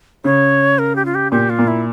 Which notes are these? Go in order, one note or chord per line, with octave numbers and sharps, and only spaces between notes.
C#3 C#5
A#4
G4
F4
G4
A#2 G4
F4
A#2
E4